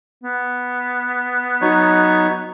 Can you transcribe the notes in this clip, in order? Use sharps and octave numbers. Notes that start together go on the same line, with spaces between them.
B3
F#3 D#4 C#5